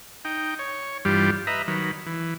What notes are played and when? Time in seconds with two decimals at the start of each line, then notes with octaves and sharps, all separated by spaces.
0.25 D#4 G5
0.59 C#5
1.05 G2 E3 G3 F4 G4
1.47 B4 D#5 E5 A#5
1.68 D#3 F#3 B4
2.06 E3